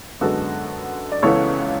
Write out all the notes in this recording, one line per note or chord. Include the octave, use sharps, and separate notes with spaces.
F#2 D3 G#3 B3 F#4 A4
D5
C#2 C#3 E3 B3 A4 C#5